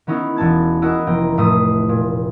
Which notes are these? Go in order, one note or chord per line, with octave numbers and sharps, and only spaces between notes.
D#3 B3 C#4 D#4 E4
E1 B3 A5 G#6
A#3 E4 F#4 D#5 E5 G#5
F1 A#3 B4 G5 A#5
F1 A2 A3 D#6 C7 D#7
A#2